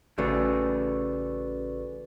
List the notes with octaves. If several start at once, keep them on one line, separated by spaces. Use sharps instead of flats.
A1 C#3 A3 F#4 B4 D5